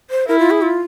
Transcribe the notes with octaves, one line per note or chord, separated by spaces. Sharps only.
C5
E4 A#4
F4
G#4
F4